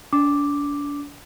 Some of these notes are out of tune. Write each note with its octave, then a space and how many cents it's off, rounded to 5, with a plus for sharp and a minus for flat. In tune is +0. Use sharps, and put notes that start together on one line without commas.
D4 -35 D6 +0